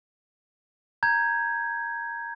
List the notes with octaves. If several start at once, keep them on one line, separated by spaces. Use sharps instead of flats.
A#5 G6 G#6